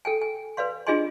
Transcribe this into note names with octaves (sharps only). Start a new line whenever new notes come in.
A4 G5 G#5
G#5
B4 D5 F5 C6
D4 F4 G#4 D#5 G#5 C6